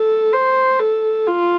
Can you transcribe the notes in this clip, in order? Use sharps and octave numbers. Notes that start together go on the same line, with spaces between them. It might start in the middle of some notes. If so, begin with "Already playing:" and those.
Already playing: A4
C5
A4
F4